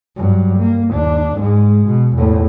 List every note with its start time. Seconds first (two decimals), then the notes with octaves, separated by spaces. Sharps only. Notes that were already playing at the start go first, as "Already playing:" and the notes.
0.17 G2 F#3
0.58 A#3
0.92 D#2 D4
1.37 G#2 G#3
1.86 B2
2.17 E2 A2